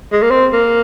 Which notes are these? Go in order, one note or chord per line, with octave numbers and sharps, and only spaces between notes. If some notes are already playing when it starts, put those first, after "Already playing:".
G#3
A#3
C4
A#3